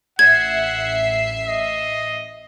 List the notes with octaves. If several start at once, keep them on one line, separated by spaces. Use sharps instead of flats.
A1 E5 F#5 G#6 C7
D#5